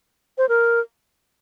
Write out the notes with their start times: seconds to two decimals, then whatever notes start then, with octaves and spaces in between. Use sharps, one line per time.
0.38 C5
0.49 A#4